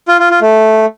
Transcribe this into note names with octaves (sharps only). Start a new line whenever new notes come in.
F4
F4
F4
A3